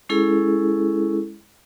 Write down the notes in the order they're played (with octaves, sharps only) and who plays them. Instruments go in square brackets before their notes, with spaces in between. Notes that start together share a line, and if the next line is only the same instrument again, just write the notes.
[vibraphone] G#3 C#4 E4 G#4 A4